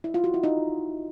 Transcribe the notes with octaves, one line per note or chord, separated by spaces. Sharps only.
E4
F4
F#4
E4
D#4